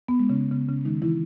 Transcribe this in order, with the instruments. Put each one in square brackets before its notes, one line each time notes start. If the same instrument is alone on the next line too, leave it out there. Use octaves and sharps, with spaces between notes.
[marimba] B3
G#3
C#3 C#4
C#3 B3
C#3 C#4
D#3 G#3 D#4
E3 E4